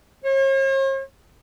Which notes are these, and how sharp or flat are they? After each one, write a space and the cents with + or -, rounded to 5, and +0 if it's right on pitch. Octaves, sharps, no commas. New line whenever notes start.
C#5 -45